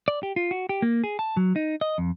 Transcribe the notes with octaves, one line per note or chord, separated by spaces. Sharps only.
D5
G4
F4
F#4
G4
A#3
G#4
A5
F#3
D#4
D#5
F2